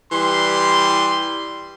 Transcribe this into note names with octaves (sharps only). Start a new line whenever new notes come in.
E3 G3 C6